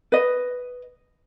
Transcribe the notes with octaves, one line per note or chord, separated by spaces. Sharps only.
B4 D#5